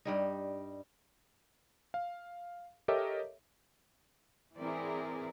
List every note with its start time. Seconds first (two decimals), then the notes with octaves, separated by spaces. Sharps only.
0.05 G2 G3 D#4
1.94 F5
2.88 G4 A4 A#4 C#5 D#5 E5
4.57 E3 C4 E4 G#4 A#4 D5